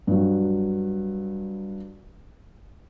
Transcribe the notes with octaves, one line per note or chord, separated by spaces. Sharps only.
G2 F#3